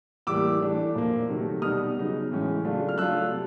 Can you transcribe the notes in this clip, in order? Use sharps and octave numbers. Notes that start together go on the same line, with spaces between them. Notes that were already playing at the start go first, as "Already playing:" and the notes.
A2 E3 G3 A#3 D6 E6
E3 A3 D4
A#2 F3 A#3
C3 D#3 F#3 A3
B2 G3 B3 D#4 D#6 F6
C#3 F#3 B3 D#4
A2 E3 G#3 C#4
C#3 F#3 A3 D4 F4
F6
F#3 A3 D4 F4 E6 F#6
C3